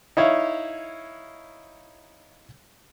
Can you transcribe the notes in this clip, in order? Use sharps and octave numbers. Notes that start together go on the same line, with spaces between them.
D#4 E4 C#5 F5